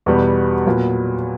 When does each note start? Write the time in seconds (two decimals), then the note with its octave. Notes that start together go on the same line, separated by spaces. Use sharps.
0.06 E2 B2 G3 B3
0.66 A#2 F#3 B3